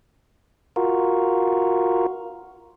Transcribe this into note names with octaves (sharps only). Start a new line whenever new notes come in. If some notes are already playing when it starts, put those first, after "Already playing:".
F4 F#4 A#4